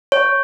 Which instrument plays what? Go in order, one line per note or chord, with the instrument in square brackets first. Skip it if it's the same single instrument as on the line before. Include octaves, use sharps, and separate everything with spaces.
[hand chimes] C#5